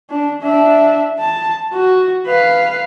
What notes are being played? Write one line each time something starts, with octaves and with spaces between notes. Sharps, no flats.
D4
D4 E5
A5
F#4
B4 F5